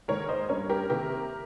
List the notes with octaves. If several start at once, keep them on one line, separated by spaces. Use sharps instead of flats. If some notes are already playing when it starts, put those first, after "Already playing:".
G#2 D#3 A#3 A#4 C#5
C5 D#5
G2 G3 A#3 C#4 A#4 C#5
G4 A#4
C3 D#3 A#3 G4 A#4